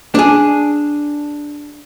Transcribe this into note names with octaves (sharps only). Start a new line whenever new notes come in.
D4 G#4